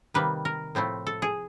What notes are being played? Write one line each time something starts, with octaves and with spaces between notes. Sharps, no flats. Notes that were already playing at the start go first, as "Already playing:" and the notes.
C3 D#3 G3 A#3 B4
A#4
A2 F3 A3 C4 E4
A4
G#4